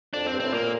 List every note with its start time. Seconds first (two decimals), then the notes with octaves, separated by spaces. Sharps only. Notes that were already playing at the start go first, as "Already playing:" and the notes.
0.14 F2 D4
0.24 F2
0.27 C4
0.33 G2
0.40 A2 C4
0.53 A#2 A#3